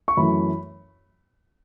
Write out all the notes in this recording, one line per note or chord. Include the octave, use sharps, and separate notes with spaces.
C#6
F#2 E3 A3 B5